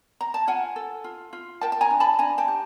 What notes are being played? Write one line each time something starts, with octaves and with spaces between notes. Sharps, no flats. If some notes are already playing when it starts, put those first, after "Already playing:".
A#5
A5
F4 F#5 G#5
A4
F4
F4
A#4 G5 A5
A5
G#5 A#5
D4
A5 B5
D4 G#5 A#5
G5 A5
G4